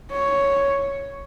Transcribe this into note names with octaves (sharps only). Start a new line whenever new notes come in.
C#5